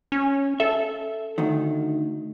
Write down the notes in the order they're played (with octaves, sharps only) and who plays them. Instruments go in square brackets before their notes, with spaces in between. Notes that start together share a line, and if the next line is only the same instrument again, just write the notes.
[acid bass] C#4
[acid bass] A4 [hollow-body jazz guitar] E5
[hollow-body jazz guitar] D2 D#3